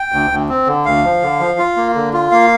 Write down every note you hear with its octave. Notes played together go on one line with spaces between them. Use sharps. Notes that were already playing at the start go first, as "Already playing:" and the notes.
Already playing: G5
D2
D2
C4
D3
D2 F5
F3
D3
F3
F4
A#3
D3
F4
A#3 F5